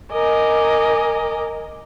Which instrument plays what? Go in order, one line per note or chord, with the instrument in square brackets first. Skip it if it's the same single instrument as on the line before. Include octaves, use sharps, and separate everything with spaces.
[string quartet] A#4 D#5 G#5 D6